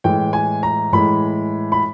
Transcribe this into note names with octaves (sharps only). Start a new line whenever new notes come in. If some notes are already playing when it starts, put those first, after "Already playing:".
A2 E3 G#3 G5
G#5
A#5
A2 E3 G#3 B5
B5